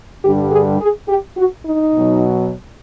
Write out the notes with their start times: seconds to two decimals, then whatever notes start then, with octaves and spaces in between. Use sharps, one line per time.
0.24 G2 D3 G3 G4
0.52 G#4
0.81 G#4
1.09 G4
1.37 F#4
1.66 D#4
1.95 B2 F#3